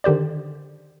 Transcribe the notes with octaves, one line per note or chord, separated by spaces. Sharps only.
D3 D#3 G4 C5 D5